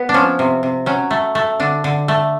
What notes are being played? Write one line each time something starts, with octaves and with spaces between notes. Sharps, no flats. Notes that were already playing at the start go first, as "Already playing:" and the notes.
Already playing: B3
D4
F3 C#4
C3
C3
F#3 C#4
A3
A3
D3 D4
D3
A3